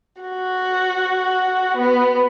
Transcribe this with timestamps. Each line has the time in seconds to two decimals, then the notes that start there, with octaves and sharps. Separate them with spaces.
0.22 F#4
1.77 B3